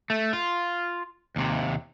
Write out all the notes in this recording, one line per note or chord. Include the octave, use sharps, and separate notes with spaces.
A3
F4
D#2 C3